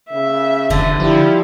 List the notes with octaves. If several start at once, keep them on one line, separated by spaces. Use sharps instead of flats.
C#3 E5
F1 D3 B4
F3 G3 E4